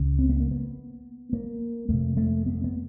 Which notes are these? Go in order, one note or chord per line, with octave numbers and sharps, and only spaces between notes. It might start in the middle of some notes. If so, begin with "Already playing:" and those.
Already playing: C#2 C#3
C4
B3
A#3
B3
A#3
F2 C3 A3
A3
B3
B3